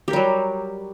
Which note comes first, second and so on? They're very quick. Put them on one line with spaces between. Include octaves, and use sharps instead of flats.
G4 A#4 G3 F#3